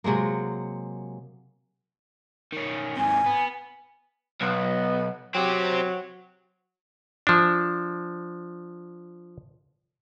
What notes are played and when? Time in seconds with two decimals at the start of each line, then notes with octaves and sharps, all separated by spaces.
0.04 C3 F#3 G#3 A#3
2.53 D#3 C#4
2.97 G#2 C3 G#5
3.26 B3
4.41 B1 B3
5.35 F#3 C4 G4
7.27 F3 D4